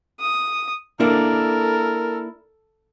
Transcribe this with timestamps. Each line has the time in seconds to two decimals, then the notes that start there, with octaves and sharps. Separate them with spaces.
0.20 D#6
1.00 A#3 D4 E4 A4 A#4